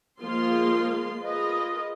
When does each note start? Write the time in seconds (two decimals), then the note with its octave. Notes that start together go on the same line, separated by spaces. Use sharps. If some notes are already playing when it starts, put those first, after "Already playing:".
0.22 F3 G#3 A#3 F4 F5 C6
1.22 F4 G#4 A#4 B4 D#5